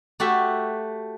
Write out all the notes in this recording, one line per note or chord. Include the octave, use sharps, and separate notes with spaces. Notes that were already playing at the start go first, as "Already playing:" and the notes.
A3 F#4 G4 E5